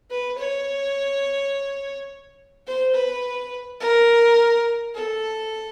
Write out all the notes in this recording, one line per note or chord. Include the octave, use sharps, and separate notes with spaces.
B4
C#5
C5
B4
A#4
A4